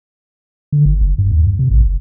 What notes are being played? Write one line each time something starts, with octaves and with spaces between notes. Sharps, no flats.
D3
G1
F#1
G2
D#2
G2
C3
A1
F#1